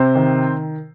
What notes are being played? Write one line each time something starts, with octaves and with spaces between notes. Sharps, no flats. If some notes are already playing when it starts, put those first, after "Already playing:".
Already playing: C3 C4 C5
D#3